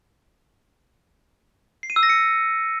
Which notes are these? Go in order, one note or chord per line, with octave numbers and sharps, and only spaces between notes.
C7
D#7
E6
A#6
C#7